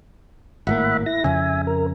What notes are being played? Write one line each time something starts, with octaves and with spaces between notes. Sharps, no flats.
G#1 A2 A#3 E5 F#5 B5
E4 A#6
F2 C#3 E5 G#5
A#4